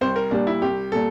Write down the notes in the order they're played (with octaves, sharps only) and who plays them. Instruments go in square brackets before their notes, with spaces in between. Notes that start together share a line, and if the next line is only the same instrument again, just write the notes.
[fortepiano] C2 [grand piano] C5
[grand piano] A#4
[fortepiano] A#2 G3 [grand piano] D4
[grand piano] E4
[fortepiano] C2 [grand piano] G4
[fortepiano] A#2 G3 [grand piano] A4